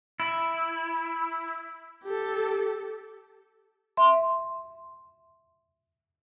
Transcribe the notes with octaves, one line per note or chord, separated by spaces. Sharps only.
E4
G4 A4
E5 C6